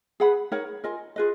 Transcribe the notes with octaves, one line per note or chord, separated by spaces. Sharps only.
G#4 B4 F#5 B5
D#4 A#4 C#5 F#5
F4 A#4 D#5 G#5
F4 G#4 B4 D#5